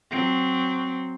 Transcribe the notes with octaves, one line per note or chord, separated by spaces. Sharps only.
F#3 C4